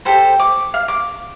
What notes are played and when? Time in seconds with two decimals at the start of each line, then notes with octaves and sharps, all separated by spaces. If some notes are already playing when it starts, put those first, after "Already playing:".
0.05 G4 A4 C5
0.40 D6
0.74 F5
0.88 D6